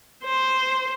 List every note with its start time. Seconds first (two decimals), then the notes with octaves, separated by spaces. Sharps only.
0.24 C5